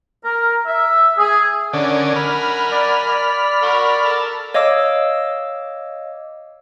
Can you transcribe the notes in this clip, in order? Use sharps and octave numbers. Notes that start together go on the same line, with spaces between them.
A#4
E5
G#4
D3 C#4 A#4 D5 F#5 G#5
B5 F6
D5
D5
A#4 F#5 C#6
A4 A#4 A5
C#5 D#5 F5 D6 E6